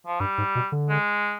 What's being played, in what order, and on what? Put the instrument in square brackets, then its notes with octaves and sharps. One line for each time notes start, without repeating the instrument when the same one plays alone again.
[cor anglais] F3
[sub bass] G2 [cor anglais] G3
[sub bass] G#2
B2
D3
[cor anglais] G#3